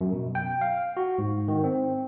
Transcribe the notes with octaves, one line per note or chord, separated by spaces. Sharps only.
F#2
B2
G5
F5
F#4
G#2
D#3
C4